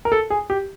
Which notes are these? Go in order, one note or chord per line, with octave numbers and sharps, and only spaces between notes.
A#4
A4
G#4
G4